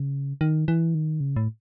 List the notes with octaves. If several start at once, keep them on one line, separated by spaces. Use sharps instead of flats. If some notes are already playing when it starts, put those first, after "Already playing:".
Already playing: C#3
D#3
E3
D#3
C#3
A2